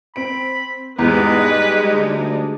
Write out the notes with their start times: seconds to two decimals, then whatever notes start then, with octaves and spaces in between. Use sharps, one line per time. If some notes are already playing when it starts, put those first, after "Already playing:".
0.16 C4 B5 D7
0.99 E2 G#2 G3 G#3 D#4 B4
1.38 D#5
1.92 D2 D4